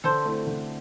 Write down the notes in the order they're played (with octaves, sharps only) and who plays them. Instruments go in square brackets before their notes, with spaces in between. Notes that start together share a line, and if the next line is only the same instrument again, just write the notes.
[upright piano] D3 [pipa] A4 C5
[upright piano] A3 C4 E4
D3